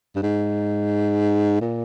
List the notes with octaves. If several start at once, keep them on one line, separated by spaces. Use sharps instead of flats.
G2
G#2
A#2